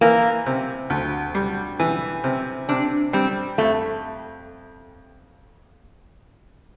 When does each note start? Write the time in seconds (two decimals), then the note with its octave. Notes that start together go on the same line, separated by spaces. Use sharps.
0.01 E3 A#3
0.46 C3
0.90 D2
1.35 G3
1.80 E3
2.24 C3
2.69 C3 D4
3.13 G3 C4
3.58 F2 A3